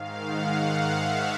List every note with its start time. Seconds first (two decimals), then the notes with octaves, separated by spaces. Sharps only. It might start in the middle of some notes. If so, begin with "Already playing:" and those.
Already playing: G#2 D#3 F5
0.24 F#5
0.66 F5
0.93 E5